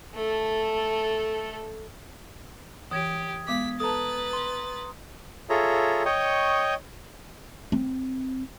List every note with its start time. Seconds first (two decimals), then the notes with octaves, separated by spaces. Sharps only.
0.14 A3 A4
2.91 E3 G4 C#5 D#6 G#6
3.48 G#3 B3 D6 B6
3.80 A4 B4 A5 A#5 D#6 A6
4.33 C6
5.49 F4 G#4 A4 C#5 E5 A#5
6.05 C#5 D#5 G5 C#6 D#6
7.72 C4